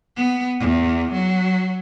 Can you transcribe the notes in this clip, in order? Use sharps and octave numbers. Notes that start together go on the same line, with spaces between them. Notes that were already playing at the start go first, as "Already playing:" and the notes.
B3
E2
F#3